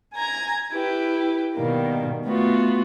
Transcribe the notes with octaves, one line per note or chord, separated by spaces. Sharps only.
G#5 A#5 G#6
E4 G4 B4
B2 D#3 G3 A#3
A3 B3 F4 F#4